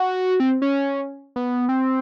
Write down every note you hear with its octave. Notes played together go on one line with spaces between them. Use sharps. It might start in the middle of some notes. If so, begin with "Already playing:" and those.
Already playing: F#4
C4
C#4
B3
C4